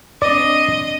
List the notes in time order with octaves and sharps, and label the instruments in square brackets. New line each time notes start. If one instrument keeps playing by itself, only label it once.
[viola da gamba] C4 D4 [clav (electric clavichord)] D5 [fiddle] D#5